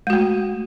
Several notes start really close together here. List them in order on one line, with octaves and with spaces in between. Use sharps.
G#3 F#4 A3